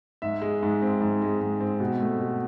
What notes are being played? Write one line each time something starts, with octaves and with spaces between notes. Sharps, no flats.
G#2 E5
G#3
G#2
C4
G#2
G#3
G#2
C4
B2
A3
B2